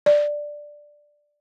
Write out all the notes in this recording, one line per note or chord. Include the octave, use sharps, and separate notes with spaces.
D5